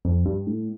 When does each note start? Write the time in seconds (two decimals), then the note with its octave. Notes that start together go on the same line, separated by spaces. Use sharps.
0.05 F2
0.26 G2
0.47 A2